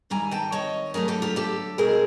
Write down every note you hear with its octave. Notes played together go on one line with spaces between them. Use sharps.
D#3 G3 C4 G#5 A#5
G5 A5
C#5 D#5
D3 F#3 A3 G#4 A#4
G4 A4
F4 G4
G4 A4
B2 G#3 C4 G#4 A#4